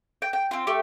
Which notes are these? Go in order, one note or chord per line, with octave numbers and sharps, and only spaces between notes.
G5
G5
C4 F4
A3 G4